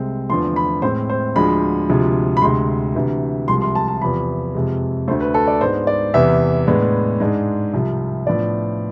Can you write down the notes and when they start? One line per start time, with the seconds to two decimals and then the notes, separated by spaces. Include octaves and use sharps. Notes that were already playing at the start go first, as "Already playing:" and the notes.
Already playing: C2 C3 G#3 C4
0.30 E2 D3 F3 A3 C6
0.56 B5
0.82 A2 G#3 C4 C5
1.10 C5
1.36 D2 D3 F3 G#3 B5
1.89 D2 C3 F3 G#3
2.37 B5
2.42 D2 C3 G#3 C6
2.95 D2 C3 E3
3.48 C2 C3 F3 G#3 C6
3.62 C6
3.75 A5
3.88 A5
4.01 E2 C3 F3 B5
4.54 F2 C3 G#3
5.08 D2 D3 A3 C5
5.21 B4
5.34 A4
5.48 D5
5.61 G#2 G#3 B3 D4 C5
5.87 D5
6.14 E2 C3 E3 E5
6.67 A2 G#3 B3 D4
7.20 G#2 G#3 D4
7.73 C2 C3 F3
8.26 A2 F3 B3 D4 D5